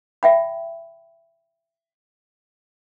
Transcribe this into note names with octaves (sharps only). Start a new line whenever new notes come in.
E5 G5 B5